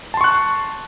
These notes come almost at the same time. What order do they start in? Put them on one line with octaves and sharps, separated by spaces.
A5 C6 C#6 F#6